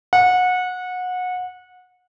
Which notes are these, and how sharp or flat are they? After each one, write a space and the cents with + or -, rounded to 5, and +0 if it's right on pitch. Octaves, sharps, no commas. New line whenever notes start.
F#5 -25